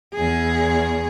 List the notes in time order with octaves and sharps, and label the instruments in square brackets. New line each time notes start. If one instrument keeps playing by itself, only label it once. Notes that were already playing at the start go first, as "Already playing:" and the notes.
[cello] E2 G#4